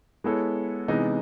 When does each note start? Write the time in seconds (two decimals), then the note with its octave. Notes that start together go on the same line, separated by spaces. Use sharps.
0.24 G#3 B3 E4 A4 C#5
0.88 C3 E3 G#3 B3 D#4